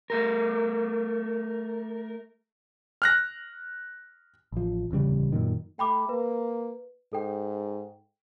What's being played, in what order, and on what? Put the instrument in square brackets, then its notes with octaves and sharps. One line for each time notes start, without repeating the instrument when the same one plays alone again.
[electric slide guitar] A3 A#4
[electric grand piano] F6 F#6 A#6
[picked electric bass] A1 F3
D1 E2 C#3 G3
F#2 A#2 D#3
[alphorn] A3 [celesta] G5 B5 D6
[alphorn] A#3 [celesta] B4
[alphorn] G#2 [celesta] A4 G5